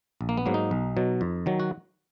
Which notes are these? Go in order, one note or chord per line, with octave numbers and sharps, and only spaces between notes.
A#1
A#3
B3
G#2 F#3 A#3
D#4
B1
B2 F#3
F2
D#3 F#3
F#4